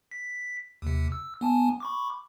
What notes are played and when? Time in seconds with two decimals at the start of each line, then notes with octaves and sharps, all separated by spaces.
0.11 B6
0.82 D#2 C3
1.12 E6
1.41 B3 G#5 A5
1.80 B5 C#6 D6